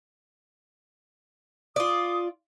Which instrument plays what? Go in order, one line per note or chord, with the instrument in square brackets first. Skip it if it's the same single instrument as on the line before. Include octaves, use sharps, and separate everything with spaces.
[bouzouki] F4 D5 [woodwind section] D#6